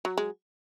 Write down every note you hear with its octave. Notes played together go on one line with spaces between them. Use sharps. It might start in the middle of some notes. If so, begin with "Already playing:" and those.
F#3
G#3